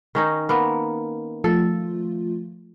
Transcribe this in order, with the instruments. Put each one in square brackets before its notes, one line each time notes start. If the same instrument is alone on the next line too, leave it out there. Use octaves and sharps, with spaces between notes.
[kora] D#3 C#4 D#4
A#3 B3 A#4
[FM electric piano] F3 A3 F4 [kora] A4